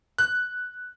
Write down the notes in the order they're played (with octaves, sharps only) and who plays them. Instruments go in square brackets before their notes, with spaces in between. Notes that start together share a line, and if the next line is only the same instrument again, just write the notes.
[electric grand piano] F#6